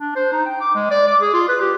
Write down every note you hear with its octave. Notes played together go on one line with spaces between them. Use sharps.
D4
C5
D#4
G5
D6
G#3
D5
D6
G#4
F4
B4
G4